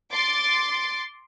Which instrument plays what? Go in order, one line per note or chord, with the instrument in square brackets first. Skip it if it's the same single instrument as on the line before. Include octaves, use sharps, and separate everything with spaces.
[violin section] C6 D6 A6